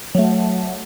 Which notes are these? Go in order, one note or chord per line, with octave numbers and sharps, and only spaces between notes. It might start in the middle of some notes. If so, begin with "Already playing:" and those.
F#3 A3